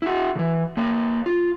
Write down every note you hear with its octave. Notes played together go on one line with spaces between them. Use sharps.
E4 F#4
C#3 E3
A#3 C#5
F4